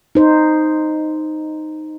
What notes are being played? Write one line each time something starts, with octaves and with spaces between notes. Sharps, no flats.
D#4 C5